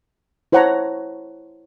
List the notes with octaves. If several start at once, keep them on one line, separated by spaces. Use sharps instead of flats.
E4 C5 C#5 F#5 A5 A#5